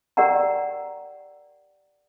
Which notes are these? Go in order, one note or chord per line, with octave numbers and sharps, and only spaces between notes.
G4 A#4 D5 F#5 G5 A#5